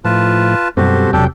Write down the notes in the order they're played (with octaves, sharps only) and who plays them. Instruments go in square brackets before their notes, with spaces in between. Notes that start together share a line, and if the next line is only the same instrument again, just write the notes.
[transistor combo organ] A2 F3 [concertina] F4 B4 A5
[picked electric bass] F#2 [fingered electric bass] B2 G3 C4 [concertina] F#4 G4 [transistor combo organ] A4 C5
[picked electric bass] E1 C3 [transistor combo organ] F#3 G5 [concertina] D4 G4 A4